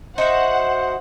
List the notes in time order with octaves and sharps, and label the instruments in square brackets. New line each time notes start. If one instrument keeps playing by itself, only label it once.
[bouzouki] D#4 F#4 E5 [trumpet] C5 [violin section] F#5